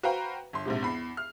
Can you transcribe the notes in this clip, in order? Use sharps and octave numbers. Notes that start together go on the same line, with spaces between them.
F#4 B4 C5 F5 G5 A#5
G1 C6
A#1 G#2 C3
E2 B5 C7
F6